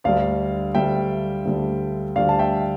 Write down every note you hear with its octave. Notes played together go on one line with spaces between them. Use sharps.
D2 D3 G3 D5 F5
D2 D3 G3 E5 G5
D2 D3 G3
D2 D3 G3 D5 F5
A5
E5 G5